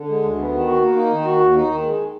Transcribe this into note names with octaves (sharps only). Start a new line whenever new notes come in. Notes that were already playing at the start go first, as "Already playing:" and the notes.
Already playing: D3
G#3
D2
B3
D#3
F#4
A#3
D#4
D#3
F#4
D#2
D#4
D#3
G#3